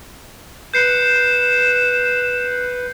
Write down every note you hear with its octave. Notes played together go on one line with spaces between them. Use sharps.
B4 G6 C7 C#7 E7